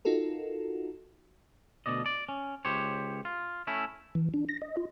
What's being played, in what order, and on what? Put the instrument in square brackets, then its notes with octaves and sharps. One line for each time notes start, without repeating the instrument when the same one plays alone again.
[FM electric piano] D#4 F4 F#4 A4 A#4
[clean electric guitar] D2 B2 D5 D#5
D5
C#4
C#2 G4 C5 C#5
F4
A3 C#4 E4
[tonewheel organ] E3
D4
A#6
D#5
F4